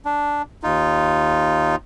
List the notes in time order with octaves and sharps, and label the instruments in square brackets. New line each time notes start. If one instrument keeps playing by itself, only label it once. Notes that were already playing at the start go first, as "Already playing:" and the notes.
[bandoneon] D4
D#2 D#4 F4